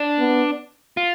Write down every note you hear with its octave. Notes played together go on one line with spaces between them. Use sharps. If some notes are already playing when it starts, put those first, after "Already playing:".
Already playing: D4
B3
F4